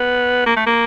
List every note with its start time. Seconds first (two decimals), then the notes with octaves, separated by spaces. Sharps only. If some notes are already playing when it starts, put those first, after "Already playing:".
Already playing: B3
0.46 A#3
0.56 A3
0.66 A#3